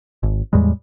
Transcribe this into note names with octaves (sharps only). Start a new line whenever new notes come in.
G#1
E2 A2 G3 G#3